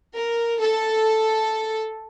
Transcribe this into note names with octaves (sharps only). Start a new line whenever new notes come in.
A#4
A4